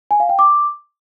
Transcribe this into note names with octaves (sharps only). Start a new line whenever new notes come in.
G#5
F5
G5
D6